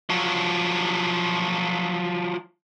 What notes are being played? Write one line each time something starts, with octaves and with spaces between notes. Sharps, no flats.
F3 F#3